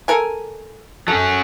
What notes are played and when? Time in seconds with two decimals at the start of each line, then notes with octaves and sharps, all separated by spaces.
0.08 A4 A#4 G#5
1.08 F#3 C#4 A4